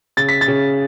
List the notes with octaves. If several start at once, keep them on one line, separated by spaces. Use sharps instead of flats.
C#3 A6
B6
A6
C#3